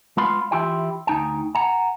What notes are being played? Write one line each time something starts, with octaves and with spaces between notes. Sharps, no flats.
G#3 B3 F4 F5 B5 C6
E3 E4 F4 G4 G5
D2 G2 D#4 G5 G#5
F#5 G#5 A#5